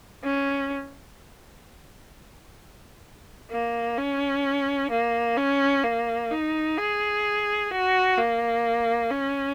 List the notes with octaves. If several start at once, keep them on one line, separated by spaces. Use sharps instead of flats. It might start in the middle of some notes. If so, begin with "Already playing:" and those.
C#4
A#3
C#4
A#3
C#4
A#3
D#4
G#4
F#4
A#3
C#4